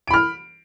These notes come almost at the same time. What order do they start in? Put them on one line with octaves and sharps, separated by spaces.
D7 B5 F6